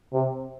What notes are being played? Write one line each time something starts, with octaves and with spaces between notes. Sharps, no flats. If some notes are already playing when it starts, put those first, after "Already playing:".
C3